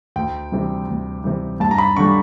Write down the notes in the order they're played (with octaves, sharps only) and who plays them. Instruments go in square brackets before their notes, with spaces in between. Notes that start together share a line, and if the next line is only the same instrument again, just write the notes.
[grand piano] D2 G5
C3 E3 G3
D2
C3 E3 G3
G2 A5
A#5
B5
D3 G3 C#6